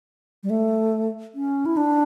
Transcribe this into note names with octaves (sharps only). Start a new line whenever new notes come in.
G3
A3
C#4
E4
D4